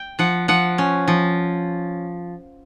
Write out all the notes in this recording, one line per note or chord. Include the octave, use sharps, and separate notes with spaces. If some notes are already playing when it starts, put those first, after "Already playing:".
Already playing: G5
F3 F#5
F3 F#5
C#4
F3